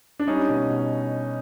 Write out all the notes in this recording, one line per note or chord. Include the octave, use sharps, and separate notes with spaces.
D4
G3 C#4 D#4
B2
B2